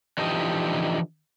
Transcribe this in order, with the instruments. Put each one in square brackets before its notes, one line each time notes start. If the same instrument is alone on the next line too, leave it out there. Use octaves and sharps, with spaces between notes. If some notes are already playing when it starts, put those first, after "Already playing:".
[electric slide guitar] D3 E3 F3 D#4 G4 D#5